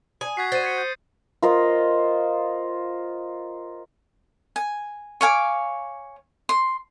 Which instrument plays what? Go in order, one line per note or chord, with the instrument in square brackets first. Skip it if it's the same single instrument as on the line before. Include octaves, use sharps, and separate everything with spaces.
[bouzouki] G#5 [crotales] D#6
[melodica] F#4 [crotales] G#6 B6 C7
[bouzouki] C5 [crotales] A6 D#7
[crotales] G#6 B6 C#7
G6
[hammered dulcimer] F4 A#4 C5 D#5
[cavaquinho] G#5
C#5 F5 G#5 D6
C6